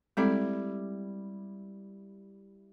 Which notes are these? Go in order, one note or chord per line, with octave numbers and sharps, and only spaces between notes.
G3 G#3 C4 E4 A4 D5